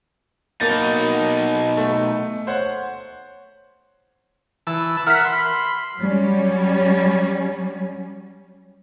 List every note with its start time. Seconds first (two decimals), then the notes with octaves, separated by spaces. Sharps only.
0.61 B2 A#3 D#4 A6
1.77 A3
2.47 C5 C#5 F#5
4.67 E3 A5 E6
5.07 A#4 E5 F#5 F6 B6
5.25 B5 C6
5.99 F#3 G3 C#4